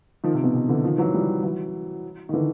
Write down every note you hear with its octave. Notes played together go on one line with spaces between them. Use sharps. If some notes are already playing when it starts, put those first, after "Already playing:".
D#3 F3
C3
B2
C3
D3 E3
D#3 F3
E3 F#3
F3 G3
E3 F#3
D#3
D3 E3